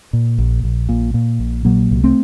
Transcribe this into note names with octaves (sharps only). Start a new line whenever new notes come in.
A#2
A#1
A#1
A#2
A#2
A#1
A#2 F#3 A#3
C2
A3 C4